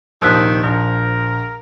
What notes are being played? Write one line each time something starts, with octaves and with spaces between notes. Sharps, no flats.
A#1 D#2 C3 D#3 F3 E6 F#6 B6
A#1 A#4